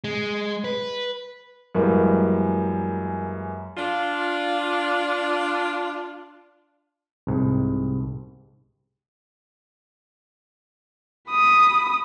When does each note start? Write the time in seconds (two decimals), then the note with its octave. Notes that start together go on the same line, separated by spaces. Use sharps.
0.04 G#3
0.64 B4
1.75 F#2 E3 G3 G#3 A#3
3.76 D4 F4
7.27 C2 G#2
11.29 B5 D#6